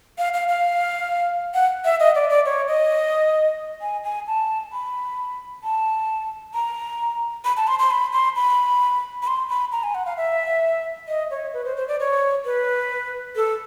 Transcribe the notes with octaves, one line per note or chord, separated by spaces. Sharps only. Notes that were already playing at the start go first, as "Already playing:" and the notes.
F5
F5
F5
F#5
E5
D#5
D5
D5
C#5
D#5
G#5
G#5
A5
B5
A5
A#5
B5
A5
C6
C6
B5
C6
B5
B5
C6
B5
A#5
G#5
F#5
F5
E5
D#5
C#5
B4
C5
C5
D5
C#5
B4
A4